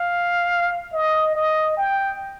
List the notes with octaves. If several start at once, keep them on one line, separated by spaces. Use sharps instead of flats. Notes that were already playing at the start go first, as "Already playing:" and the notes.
Already playing: F5
D#5
D#5
G5